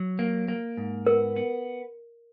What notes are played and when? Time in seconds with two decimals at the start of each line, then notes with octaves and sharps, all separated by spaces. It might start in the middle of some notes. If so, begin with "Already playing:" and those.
Already playing: F#3
0.19 A#3
0.48 A#3
0.77 G#2
1.06 B3 A#4
1.36 B3